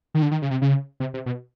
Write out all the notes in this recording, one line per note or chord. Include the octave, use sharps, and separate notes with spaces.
D#3
D3
D#3
C#3
C3
C#3
C3
C3
B2